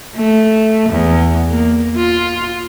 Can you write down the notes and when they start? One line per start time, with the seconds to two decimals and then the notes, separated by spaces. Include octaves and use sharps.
0.16 A3
0.90 E2
1.50 A#3
1.97 F4